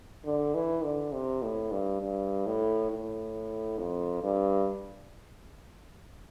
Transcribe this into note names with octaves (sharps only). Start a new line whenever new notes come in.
D3
E3
D3
C3
A2
G2
G2
A2
A2
F2
G2